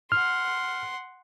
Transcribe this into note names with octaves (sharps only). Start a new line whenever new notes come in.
F#5 C6 F6